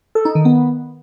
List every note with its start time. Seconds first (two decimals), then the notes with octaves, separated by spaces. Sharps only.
0.15 A4
0.25 D#4
0.35 D#3
0.45 B3